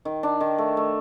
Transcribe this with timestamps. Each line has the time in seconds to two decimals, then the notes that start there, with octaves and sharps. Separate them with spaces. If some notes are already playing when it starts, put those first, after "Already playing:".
0.05 D#3
0.23 D4
0.40 D#3
0.58 A3
0.77 A3